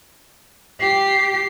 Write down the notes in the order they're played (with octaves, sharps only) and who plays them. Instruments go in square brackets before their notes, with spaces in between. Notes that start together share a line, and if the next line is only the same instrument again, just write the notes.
[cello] G4 [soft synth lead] C7